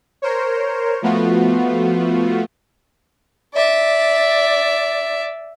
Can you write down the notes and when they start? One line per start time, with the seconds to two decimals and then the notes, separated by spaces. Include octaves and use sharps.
0.22 A#4 C5 C#5
1.02 F3 A3 B3 F4 F#4
3.54 D5 E5